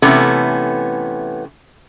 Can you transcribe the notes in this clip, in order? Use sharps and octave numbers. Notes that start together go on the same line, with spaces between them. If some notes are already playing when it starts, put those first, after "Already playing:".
C3 E3 A3 B3 C#4